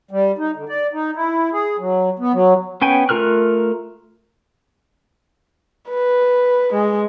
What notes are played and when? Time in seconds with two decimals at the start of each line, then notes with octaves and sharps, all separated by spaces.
0.11 G3
0.38 D#4
0.56 D3
0.69 D5
0.93 D#4
1.15 E4
1.53 G#4
1.79 F#3
2.19 B3
2.33 F#3
2.82 B3 C#4 G5 G#5
3.09 A3 F4 A#4 F6 F#6
5.90 B4
6.73 G#3